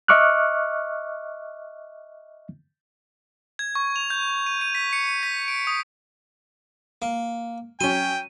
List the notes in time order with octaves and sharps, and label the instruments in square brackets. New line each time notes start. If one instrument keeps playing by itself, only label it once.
[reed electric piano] D#5 E5 C#6 D6 F6 F#6
[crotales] G#6
C#6
F7
G6
D#7
D#7
B6
C#7
D#7
B6
D7
D#6
[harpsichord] A#3
[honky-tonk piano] F#3 C#4 [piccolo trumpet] G5 [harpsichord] C6 [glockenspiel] D#7